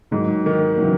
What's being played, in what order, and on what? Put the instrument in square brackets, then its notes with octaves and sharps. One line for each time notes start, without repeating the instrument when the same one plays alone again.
[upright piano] G#2 [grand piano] D#3 F#3
[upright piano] D#3
[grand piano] F#3
C#3 E3